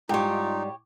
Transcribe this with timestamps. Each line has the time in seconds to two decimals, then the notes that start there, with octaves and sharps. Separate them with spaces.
0.09 G#2 G3 D#4 F4 G4 C#5